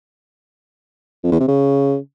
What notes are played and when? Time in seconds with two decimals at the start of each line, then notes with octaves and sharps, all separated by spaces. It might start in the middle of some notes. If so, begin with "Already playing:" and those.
1.24 F2
1.32 E2
1.40 C3
1.48 C#3